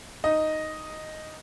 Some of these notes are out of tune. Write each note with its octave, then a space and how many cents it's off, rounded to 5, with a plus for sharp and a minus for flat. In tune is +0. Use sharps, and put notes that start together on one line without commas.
D#4 +0 D#5 +0